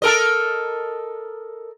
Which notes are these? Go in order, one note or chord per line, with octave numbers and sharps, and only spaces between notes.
A4 A#4 D#5